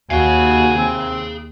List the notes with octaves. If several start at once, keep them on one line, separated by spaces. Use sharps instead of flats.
D#2 F#4 G#4 F5 G#5
C4